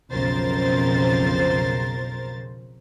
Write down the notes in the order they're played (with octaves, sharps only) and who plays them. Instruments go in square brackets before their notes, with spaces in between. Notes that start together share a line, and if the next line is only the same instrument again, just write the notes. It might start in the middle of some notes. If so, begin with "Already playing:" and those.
[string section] B1 F2 C#3 A#4 C5 A6